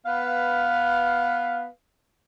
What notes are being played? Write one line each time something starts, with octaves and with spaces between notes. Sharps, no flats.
B3 B4 F5